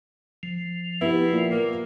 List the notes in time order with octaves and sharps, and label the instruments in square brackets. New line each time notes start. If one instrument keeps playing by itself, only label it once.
[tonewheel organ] F3
[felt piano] B3 G4 [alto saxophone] E4
[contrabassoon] A#2
[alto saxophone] A#3